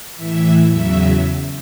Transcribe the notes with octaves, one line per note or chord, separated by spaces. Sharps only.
A2 E3 E5
E2 C#3 F#3 E5